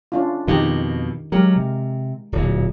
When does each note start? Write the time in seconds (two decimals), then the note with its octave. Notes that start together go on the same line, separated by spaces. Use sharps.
0.12 C#4 D4 F4
0.47 F2 B2 D#3 D#4 G4
1.32 F#3 G#3 G4 A#4
1.56 C3
2.32 D1 A#2